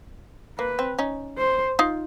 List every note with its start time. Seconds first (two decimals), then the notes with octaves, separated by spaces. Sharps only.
0.59 A#3 B4
0.79 C4
0.99 C#4 D#4
1.38 C5
1.79 D#4 F4